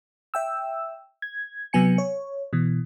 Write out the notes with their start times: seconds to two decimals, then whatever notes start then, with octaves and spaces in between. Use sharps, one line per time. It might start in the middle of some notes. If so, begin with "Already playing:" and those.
0.34 E5 G5 E6
1.22 G#6
1.73 C3 F#3 B3 G#5 C#7
1.98 C#5
2.53 B2 E3